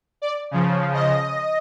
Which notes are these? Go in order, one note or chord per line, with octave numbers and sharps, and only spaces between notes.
D5
C#3 F3
D#5